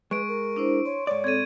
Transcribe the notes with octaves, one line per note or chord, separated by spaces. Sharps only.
G#3 B4 C#6 D7
A#4
D4 E4 C5
C#5 C6
G#2 C#5 D5
C4 A4 G#6 D#7